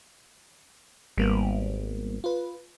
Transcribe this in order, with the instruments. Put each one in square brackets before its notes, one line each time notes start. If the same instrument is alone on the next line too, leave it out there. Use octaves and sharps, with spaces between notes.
[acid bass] G#1 [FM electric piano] G3 A#3 B3
[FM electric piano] F4 B4